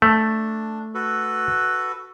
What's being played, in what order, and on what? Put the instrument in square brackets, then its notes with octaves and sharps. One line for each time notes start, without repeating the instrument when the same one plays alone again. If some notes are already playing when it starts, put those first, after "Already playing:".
[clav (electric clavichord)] A3 [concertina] D4
[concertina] F#4 A4 B4